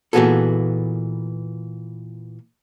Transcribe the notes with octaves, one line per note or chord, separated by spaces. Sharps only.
A#2 E3 B3 F#4 G#4 A4